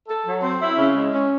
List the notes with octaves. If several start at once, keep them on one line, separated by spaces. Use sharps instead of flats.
A4
F#3
C4
E4
C#3
G#3
C#4